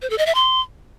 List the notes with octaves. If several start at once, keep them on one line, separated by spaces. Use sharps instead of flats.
C5
A4
D#5
E5
C6